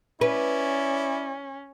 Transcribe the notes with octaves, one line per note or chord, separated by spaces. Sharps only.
C#4 E4 B4 D5